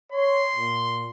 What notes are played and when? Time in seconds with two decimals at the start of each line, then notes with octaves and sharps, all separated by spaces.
0.12 C#5 C6
0.56 A#2